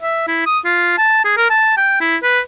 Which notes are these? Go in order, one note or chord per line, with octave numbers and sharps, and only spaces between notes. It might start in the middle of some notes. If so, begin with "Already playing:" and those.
E5
E4
D#6
F4
A5
G#4
A#4
A5
G5
E4
B4